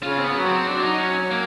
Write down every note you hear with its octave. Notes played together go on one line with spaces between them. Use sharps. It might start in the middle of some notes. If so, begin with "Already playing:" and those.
C#3 F4
C4
B3
F#3
C4
F#3 D4
D#4
C#4
A#3